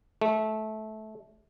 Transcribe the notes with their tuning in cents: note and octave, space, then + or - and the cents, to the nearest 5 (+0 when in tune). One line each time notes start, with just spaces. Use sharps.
A3 -20